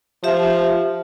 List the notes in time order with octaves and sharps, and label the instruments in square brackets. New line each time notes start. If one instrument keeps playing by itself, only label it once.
[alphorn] F3 [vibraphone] G4 E5